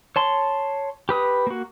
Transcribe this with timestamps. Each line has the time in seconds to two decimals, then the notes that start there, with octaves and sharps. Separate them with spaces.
0.16 C#5 A5 C6
1.09 G4 B4 D#6
1.47 A#3 F#4